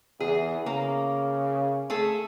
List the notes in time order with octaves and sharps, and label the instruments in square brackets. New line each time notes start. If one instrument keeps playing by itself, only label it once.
[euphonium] E2 [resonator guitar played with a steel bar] G#4
[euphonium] C#3 [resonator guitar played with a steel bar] A#3
[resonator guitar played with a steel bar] A3 G#4 A4